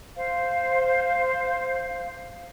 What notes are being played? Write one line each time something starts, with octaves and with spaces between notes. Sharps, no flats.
C5 F5